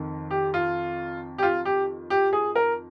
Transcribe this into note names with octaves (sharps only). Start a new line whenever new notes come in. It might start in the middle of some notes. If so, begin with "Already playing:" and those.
Already playing: F2 D#3
G4
F4
G4
F4
G4
G4
G#4
A#4